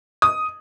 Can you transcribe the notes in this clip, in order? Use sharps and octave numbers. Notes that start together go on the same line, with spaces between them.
D#6